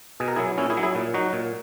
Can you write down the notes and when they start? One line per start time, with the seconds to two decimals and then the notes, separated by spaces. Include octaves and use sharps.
0.20 B2 G#4
0.28 A#4
0.36 F#3 E4 G#4
0.58 A#2 C#4 E4
0.70 E4 G#4
0.77 F#3
0.83 E4 G#4
0.95 A#2
1.14 F#3 D#4 F#4
1.33 A#2